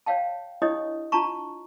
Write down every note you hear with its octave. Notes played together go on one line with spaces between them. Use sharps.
C#5 D5 F5 G5 A5
D4 E4 G4 C#5 D#5 D#6
D4 F4 A5 A#5 C#6